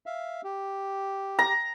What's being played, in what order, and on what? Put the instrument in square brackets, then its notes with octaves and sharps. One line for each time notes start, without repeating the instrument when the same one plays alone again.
[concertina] E5 F5
G4
[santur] A#5